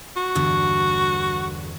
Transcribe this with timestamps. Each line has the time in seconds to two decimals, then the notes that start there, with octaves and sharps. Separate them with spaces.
0.17 F#4
0.35 E2 G2 D3